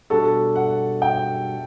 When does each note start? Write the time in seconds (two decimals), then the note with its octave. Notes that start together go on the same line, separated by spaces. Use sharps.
0.10 B2 G3 D4 F#4 A4
0.56 F#5
1.02 G5